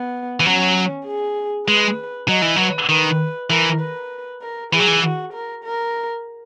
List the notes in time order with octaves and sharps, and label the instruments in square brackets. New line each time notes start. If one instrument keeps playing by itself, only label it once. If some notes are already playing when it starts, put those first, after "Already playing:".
Already playing: [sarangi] B3
[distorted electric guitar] E3
[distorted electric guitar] F#3 [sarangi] C#4
[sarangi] G#4
[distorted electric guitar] G#3 [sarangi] B4
[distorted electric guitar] F#3 [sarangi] D#5
[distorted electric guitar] E3
[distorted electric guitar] F#3 [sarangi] B4
[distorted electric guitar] D#3 [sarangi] B4
[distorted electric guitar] E3 [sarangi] A#4
[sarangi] B4
A#4
[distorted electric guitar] E3 [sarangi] G#4
[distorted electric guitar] F#3
E3
[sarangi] F#4
A#4
A#4